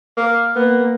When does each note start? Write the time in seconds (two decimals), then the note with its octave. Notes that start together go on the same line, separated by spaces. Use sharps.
0.17 A#3
0.56 A#3 B3